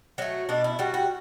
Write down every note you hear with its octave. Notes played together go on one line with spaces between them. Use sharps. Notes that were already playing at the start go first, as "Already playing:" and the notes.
F#3 A3 F#4
B2 D4
E4
G3 F#4
F#4